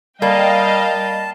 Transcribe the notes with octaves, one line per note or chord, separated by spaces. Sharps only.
G3 A#3 D#5 F5 G5 A5